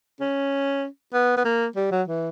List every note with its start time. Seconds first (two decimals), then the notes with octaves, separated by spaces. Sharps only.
0.20 C#4
1.14 B3
1.37 B3
1.45 A#3
1.76 G3
1.92 F#3
2.08 E3